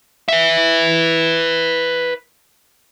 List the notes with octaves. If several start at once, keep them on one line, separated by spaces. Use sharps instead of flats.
B4 E5